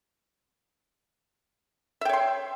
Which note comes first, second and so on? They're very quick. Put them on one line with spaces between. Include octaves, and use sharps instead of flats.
E5 G5 C#5 C6